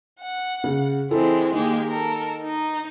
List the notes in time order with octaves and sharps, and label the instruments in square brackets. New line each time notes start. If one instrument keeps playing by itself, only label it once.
[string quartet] F#5
[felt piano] C#3
[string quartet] E3 G#3 C4 [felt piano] E4 A4
[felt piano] D#3 [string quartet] G#3 A#3 G4
[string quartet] A4 A#4
D#4